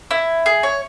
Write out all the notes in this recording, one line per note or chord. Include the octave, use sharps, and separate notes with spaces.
E4
G#4
C#5